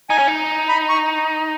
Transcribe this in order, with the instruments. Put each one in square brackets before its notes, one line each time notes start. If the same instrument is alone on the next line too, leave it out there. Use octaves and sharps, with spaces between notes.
[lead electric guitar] D#4 [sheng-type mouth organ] G#5
[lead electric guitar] C#4
D#4
[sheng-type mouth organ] B5
C#6